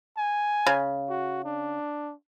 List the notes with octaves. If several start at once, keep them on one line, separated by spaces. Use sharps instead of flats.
G#5
C#3
F#4
D4